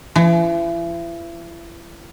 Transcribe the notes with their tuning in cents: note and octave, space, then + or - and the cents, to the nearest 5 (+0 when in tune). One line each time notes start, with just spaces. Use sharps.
E3 +40